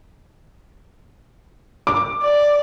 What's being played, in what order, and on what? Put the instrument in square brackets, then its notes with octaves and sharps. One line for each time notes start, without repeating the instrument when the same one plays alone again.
[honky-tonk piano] D6
[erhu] D5